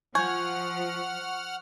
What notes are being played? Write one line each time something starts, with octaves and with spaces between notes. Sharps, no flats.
F3 F#5 G#5 C#6 F6